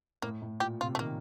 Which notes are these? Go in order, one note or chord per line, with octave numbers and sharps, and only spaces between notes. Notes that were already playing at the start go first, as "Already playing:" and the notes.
A2 A#3
A2
A#2 G4
C3 F4
A3
D#3 A#3